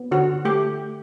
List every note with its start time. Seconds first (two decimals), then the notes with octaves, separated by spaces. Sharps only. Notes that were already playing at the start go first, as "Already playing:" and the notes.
Already playing: B3
0.11 D3 F#4
0.45 A3 G4